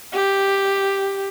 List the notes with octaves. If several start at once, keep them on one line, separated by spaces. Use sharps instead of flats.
G4